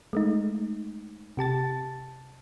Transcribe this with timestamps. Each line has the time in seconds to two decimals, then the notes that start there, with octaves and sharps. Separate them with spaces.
0.13 G#3 A3 D#4
1.37 C3 G4 A5 A6